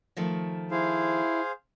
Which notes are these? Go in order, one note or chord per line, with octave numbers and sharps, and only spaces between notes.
D#3 F3 A3
E4 G#4 C5 F5